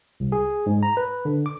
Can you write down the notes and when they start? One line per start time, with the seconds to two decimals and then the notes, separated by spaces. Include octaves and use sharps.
0.20 C2
0.32 G#4
0.66 G#2
0.83 A#5
0.97 B4
1.25 D3
1.46 D6